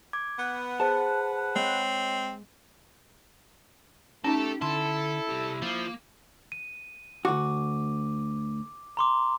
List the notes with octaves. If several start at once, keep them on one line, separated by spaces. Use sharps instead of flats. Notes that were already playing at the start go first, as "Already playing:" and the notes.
D6 G#6
B3 B4 F#5
G#4 C5 A5
G#3 C4 C#5
A3 C#4 D#4 G4 A4 G5
D3 E4 A4 C6
C2 G4
F3 A#3
D#7
D2 F#4 D6
A#5 C6 D6